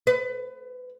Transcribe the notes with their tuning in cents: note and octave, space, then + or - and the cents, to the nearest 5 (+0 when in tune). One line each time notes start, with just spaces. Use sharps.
B4 +25